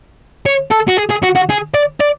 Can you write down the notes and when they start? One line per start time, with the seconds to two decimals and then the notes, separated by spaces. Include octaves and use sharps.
0.46 C#5
0.71 A4
0.88 F#4
0.97 G#4
1.10 G#4
1.23 F#4
1.35 F#4
1.49 G#4
1.74 D5
2.01 D5